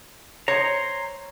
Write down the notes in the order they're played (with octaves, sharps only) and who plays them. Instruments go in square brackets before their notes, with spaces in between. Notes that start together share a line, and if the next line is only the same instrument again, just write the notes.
[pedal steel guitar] C5 A#5 [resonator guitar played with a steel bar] C#5